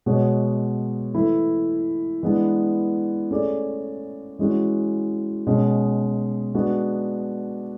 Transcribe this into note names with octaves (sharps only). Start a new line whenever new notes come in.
B2 G#3 B3 F#4 C#5
E3 A3 E4
E3 G#3 B3 D4
A3 C#4 G#4 D5
E3 G#3 C#4 F#4
B2 G#3 C#4
G#3 B3 D4 F#4